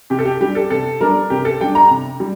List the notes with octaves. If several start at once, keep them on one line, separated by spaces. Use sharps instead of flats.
C3 G4
A4
G4
G3 D4 G4
A4
C3 A4
G3 D4 A#4
C3 G4
A4
G3 D4 G5
A#5
C3
G3